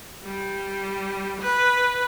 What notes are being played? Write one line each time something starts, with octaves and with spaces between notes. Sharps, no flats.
G3
B4